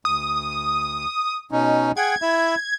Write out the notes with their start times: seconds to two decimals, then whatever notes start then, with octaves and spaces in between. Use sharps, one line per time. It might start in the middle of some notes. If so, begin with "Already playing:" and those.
0.05 D2 D#6
1.51 B2 C#4 D#4
1.97 G#4 F#5 G5 G#6
2.22 E4 E5